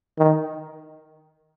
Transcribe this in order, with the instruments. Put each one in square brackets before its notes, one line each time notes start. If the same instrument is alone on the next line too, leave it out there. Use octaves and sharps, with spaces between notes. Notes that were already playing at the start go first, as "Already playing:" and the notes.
[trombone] D#3